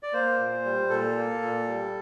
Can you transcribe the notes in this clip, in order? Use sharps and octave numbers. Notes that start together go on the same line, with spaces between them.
D5
A#3 C5
A#2
G3
A#2 A4
A#3
A#2
G3